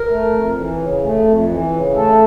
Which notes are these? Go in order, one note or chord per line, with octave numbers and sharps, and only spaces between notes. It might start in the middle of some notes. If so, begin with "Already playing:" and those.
Already playing: A#4
A3
F2
E3
C#3
A3
F2
E3
C#3
A3 A4